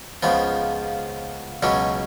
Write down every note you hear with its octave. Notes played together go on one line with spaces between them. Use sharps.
C#2 C#3 F3 B3
C#2 B2 F#3 C#4